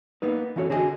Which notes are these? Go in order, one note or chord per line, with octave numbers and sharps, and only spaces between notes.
A#3 B3 D#4 B4
E3 C#4 E4 F#4 A4 C#5
D3 F#4 G#4 A4 D#5 G#5